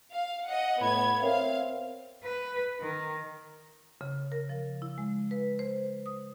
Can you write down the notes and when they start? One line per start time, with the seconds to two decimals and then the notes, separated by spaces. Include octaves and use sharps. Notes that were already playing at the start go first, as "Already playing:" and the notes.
0.13 F5
0.48 D#5 F#5
0.81 A2 B3 B5 G#6
1.22 C4 A#4 C#5 E5 F5
2.24 B4
2.81 D#3
4.01 C#3
4.32 A#4
4.49 F3
4.82 E4
4.98 G#3
5.31 B4
5.59 C5
6.06 D#6